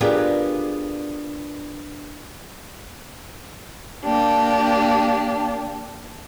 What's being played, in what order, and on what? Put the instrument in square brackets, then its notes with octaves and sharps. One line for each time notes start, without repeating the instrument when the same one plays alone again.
[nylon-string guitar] B3 D4 F4 G4 G#4 A#4
[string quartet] A#3 D4 G4